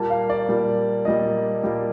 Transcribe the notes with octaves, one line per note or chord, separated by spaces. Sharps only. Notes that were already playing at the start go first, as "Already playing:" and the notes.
Already playing: A#2 G3 A#3 A5
F5
D5
A#2 G3 A#3
A#2 G3 A#3 D#5
A#2 G3 A#3